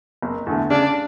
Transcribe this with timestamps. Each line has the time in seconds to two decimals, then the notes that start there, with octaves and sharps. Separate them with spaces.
0.22 F#1
0.47 E2 D3 A3
0.70 C#3 D4